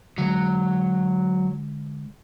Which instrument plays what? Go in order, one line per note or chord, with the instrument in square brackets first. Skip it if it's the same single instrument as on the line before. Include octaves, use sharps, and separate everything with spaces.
[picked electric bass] D3 G#3 [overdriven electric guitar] F#3